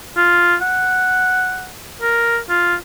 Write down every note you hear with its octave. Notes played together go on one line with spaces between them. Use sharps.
F4
F#5
A#4
F4